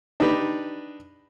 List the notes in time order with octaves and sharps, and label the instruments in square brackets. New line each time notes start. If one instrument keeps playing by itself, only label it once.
[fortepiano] D4 D#4 G4 B4